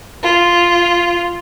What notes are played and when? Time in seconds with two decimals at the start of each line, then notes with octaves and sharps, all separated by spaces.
0.23 F4